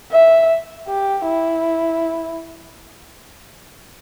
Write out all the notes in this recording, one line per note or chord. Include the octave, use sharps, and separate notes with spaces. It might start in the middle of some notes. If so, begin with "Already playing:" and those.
E5
G4
E4